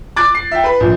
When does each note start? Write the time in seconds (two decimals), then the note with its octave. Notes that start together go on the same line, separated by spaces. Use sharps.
0.16 D6 F#6 G#6 A6 D7
0.35 C7
0.51 E5 G5
0.64 B4 B5
0.80 A#1